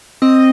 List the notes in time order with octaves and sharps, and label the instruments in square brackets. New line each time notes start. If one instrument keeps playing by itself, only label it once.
[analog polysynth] C4 D#5